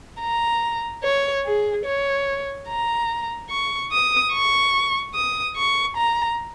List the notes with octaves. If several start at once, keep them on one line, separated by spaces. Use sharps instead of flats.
A#5
C#5
G#4
C#5
A#5
C#6
D#6
C#6
D#6
C#6
A#5